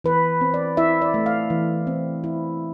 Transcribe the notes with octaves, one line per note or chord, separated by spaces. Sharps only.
E3 B4
C4
D5
E4 E5
D5
A3
F5
E3
C4
E4